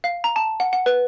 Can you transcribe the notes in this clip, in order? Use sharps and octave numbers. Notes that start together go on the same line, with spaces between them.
F5
A#5
A5
F#5
F#5
B4